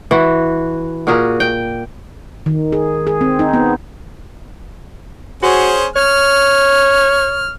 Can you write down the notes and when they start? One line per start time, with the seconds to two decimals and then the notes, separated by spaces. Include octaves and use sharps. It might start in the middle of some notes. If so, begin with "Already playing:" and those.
0.11 E3 F#4
1.07 A#2 F#4 G#4 A#4
1.40 G5
2.46 D#3
2.72 G#4
3.07 G#4
3.21 C4
3.39 D#4
3.53 B3
5.43 C#4 F#4 G#4 C5
5.96 C#5 F6